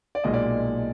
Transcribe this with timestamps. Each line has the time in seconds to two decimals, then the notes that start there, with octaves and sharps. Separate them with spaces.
0.15 D5
0.24 B1 A#2 G#3 D#5
0.34 D5